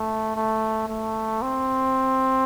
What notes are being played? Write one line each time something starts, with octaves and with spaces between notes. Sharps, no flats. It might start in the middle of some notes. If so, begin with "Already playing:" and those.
Already playing: A3
A3
A3
C4